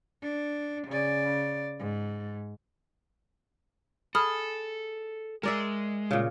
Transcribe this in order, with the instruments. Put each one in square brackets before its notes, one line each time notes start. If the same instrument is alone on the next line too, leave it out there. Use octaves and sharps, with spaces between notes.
[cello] D4
C#3 D5
G#2
[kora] G#4 [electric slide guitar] A4 [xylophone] B5 D#6 F6
[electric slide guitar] G#3 [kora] A#4 D5 E5
[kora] A#2 C#3